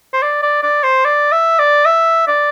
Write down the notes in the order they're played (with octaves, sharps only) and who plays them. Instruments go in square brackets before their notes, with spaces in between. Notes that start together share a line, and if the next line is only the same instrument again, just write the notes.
[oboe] C5
D5
D5
D5
C5
D5
E5
D5
E5
D5